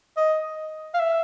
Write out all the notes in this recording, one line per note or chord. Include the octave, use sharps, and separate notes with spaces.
D#5
F5
E5